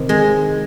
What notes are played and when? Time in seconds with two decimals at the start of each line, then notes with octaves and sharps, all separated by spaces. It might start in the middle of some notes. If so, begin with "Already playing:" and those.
Already playing: C3 D#3
0.09 G#3